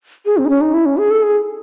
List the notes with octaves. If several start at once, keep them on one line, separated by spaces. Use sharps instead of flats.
G#4
C4
D#4
C#4
D#4
E4
C#4
G#4
A4
G#4